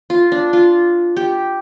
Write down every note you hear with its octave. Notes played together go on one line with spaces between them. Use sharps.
F4
D4
F4
G4